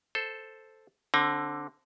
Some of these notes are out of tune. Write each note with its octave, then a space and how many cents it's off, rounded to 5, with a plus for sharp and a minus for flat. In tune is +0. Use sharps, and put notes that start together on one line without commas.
A4 +0 C5 +0
D3 +0 C4 +30